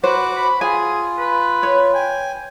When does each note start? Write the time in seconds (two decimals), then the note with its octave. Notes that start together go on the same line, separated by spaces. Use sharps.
0.04 F#4 B4 C5 F#5 D6
0.36 B5
0.61 F4 G#4 G#5
1.18 B4
1.63 C#5
1.94 G5 G#5